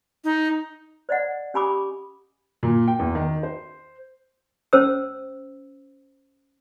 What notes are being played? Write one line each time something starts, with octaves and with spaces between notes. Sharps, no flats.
D#4
C5 D5 D#5 F#5
C#4 G4 G#5 B5 D6 D#6
A#2
G5
E2
D#3
C5
C#4 C5 E6